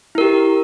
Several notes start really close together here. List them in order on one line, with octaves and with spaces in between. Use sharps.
E4 A#4 G4